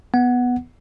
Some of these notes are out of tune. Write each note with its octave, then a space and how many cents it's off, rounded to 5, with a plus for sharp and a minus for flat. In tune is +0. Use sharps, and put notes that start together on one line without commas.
B3 +0 F#5 +0